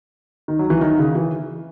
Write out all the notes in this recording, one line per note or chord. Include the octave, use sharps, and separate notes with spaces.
D#3
F#3
E3
D#3
C#3
E3